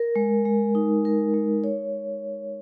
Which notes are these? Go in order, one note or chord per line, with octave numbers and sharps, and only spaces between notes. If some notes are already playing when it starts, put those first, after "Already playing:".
Already playing: A#4
G#3
G#3
D#4
A#4
G#3
C#5